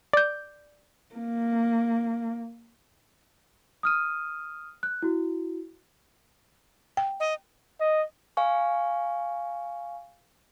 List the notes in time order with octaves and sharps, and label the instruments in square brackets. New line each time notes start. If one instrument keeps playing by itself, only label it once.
[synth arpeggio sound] D5 G6
[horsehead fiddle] A#3
[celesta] D#6 F6 D#7
F#6
E4 F#4
[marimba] G5
[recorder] D#5
[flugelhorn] D#5
[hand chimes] F5 G#5 C#6